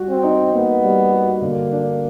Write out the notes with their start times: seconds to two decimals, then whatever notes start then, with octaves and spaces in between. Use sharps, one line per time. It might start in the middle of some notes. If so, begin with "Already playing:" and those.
Already playing: G3 F#4
0.09 C4
0.23 D#4
0.53 A#3 B3
0.83 G3
1.12 F#4
1.42 D3 A#3
1.71 D4